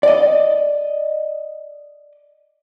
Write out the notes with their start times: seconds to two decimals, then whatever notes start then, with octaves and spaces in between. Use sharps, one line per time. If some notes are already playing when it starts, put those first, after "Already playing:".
0.03 D5 D#5